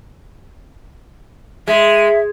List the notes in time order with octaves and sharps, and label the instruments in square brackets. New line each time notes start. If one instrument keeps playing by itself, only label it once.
[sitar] G#3 [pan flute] E5